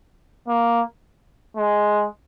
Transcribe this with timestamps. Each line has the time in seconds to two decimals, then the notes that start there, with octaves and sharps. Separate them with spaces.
0.48 A#3
1.57 G#3